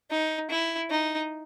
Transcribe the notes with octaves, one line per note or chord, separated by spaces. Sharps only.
D#4
E4
D#4